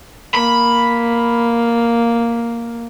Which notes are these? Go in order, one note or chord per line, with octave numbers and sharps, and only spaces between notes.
A#3 B5